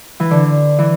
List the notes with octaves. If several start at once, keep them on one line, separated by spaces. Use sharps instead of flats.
E3
D3
E3